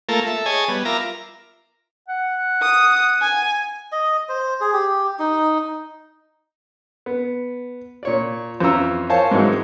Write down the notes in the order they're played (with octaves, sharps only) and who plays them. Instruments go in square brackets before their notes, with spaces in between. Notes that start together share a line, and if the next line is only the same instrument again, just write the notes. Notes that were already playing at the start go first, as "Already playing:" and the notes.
[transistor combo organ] A3 A#3 F4 A4 A#4
A4 E5
G#4 C#5 D#5 G#5 A5
G3 B3
F4 A#4 E5 A#5 D6
[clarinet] F#5
[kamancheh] D#6
G#5
[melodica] D#5
C5
G#4
G4
D#4
[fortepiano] B3
A#2 C#5 D5
F2 E3 C#4 F4 A#5 E6
A#4 C5 C#5 F5 G#5 A5
G#2 D#3 E3 F#3 G#3